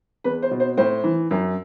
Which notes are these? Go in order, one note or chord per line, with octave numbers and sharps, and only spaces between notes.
E2 B4
C5
B2
C5
A2 C5
E3
F#2